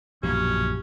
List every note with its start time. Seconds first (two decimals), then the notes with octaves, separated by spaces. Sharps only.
0.23 A#1 F#2 B2 E3 C#4 G4